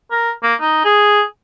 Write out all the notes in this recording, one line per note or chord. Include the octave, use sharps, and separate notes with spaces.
A#4
A#3
D#4
G#4